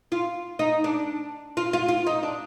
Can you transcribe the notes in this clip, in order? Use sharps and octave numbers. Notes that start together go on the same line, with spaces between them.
F4
D#4
D4
F4
F4
F4
D#4
D4